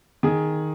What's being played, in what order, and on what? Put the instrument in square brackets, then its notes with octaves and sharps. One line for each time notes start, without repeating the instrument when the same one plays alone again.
[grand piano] D#3 G#4